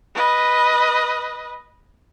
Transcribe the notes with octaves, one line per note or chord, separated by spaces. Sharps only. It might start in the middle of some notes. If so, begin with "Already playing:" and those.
B4 D#5